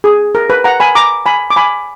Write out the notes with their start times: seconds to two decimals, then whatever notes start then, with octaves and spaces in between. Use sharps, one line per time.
0.04 G#4
0.35 A#4
0.50 B4
0.64 F#5 A#5
0.80 G#5 B5
0.95 A#5 D6
1.26 G#5 B5
1.50 D6
1.56 G#5 B5